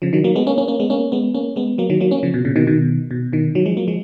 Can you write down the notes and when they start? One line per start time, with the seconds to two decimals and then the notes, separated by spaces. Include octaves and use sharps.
0.02 C#3 F3
0.13 D#3 F#3
0.24 F#3 A#3
0.35 G#3 B3
0.47 A#3 C#4
0.58 A#3 C#4
0.68 A#3 C#4
0.80 G#3 B3
0.90 A#3 C#4
1.12 G#3 B3
1.34 A#3 C#4
1.56 G#3 B3
1.78 F#3 A#3
1.90 D#3 F#3
2.00 F#3 A#3
2.11 A#3 C#4
2.23 C#3 F3
2.34 B2
2.45 A#2 C#3
2.56 B2 D#3
2.67 B2 D#3
3.11 B2
3.32 B2 D#3
3.55 D#3 F#3
3.66 F3 G#3
3.77 F#3 A#3
3.88 F3 G#3